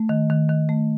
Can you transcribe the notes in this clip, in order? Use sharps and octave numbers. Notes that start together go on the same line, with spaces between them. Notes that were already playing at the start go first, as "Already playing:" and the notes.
Already playing: A3
D#3
D#3
D#3
A3